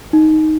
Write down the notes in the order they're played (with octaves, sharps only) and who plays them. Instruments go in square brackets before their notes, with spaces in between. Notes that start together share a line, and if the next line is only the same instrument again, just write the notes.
[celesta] D#4